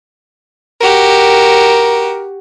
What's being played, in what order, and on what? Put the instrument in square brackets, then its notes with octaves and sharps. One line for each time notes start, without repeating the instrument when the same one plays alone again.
[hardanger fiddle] F#4 G4 [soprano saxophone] A#4